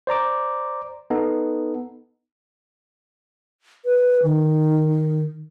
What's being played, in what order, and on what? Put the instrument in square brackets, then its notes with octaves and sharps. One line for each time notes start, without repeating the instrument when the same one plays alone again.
[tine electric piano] C5 D5 A#5 D6
B3 D#4 A4
[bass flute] B4
D#3